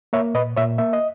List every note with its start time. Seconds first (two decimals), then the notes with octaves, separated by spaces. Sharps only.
0.13 A#3 C#5 E5
0.34 A#2 B4 D#5
0.57 A#2 C#5 E5
0.78 A#3 E5
0.93 D#5